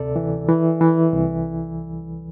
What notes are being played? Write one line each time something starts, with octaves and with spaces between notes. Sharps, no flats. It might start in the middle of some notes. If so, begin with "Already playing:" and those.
Already playing: D2 C3 A4 D5
E3
E3
E3
C2